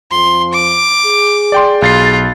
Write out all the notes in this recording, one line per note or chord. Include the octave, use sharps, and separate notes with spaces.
F2 F3 C6
D6
G#4
D5 G5 C6
B1 F4 A6 C7